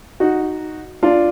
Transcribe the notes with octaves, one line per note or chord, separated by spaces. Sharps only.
D#4 F#4
D4 F4